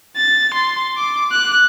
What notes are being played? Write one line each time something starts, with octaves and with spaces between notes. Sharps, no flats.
A6
C6
D6
F#6